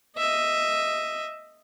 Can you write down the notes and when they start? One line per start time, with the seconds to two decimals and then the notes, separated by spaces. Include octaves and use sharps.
0.17 D#5 E5